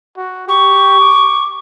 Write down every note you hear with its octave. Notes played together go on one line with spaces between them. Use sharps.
F#4
G4 C#6
D6